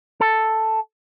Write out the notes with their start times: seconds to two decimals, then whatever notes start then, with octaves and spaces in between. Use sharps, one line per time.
0.21 A4